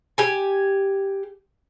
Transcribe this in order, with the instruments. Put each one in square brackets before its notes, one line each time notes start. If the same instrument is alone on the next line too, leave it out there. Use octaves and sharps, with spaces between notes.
[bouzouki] G4 G#5